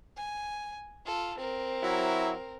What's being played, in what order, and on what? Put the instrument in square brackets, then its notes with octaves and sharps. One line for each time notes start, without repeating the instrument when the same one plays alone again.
[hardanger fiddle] G#5
F4 A4
C4 A#4
[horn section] F#3 E4